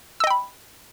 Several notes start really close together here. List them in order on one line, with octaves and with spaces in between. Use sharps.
E6 D#5 G5 B5